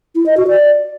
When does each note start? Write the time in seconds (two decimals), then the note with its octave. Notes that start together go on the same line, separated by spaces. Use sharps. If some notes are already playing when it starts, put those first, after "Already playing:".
0.15 E4
0.26 D#5
0.37 F#4
0.48 D5